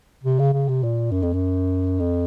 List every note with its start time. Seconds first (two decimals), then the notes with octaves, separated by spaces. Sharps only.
0.24 C3
0.39 C#3
0.53 C#3
0.68 C3
0.83 A#2
1.11 F#2
1.23 F2
1.33 F#2
2.00 F2